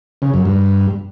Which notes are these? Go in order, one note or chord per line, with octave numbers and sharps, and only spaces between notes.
C#3
F#2
G2